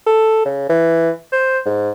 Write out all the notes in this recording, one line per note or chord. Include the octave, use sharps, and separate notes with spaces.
A4
C#3
E3
C5
G#2